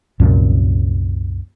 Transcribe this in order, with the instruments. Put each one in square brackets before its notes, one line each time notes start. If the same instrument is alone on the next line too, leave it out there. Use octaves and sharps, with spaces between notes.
[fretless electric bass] C2 F#2 A#2 F3